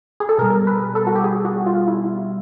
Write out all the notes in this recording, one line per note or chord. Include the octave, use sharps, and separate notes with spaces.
G#4
A4
B2 G3 A#4
B4
A4
F#4
G4
G#4
F#4
F4
E4